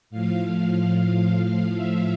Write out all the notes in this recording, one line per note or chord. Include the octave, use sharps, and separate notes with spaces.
A2 F3 F5
F5
F5
E5